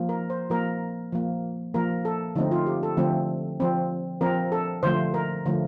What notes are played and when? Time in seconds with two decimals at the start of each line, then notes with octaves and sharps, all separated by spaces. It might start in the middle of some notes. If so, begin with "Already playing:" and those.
Already playing: F3 A#3
0.09 A#4
0.30 C5
0.50 F3 A#3 A#4
1.12 F3 A#3
1.74 F3 A#3 A#4
2.05 A4
2.35 D3 F3 A3 C4 D#4
2.51 F4
2.66 G4
2.83 A4
2.97 D3 F3 A3 C4
3.60 F3 C4
4.21 F3 C4 A#4
4.52 A4
4.83 D3 F3 A3 C5
5.14 A#4
5.46 D3 F3 A3